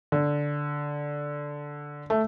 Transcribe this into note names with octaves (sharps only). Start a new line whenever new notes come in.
D3
A3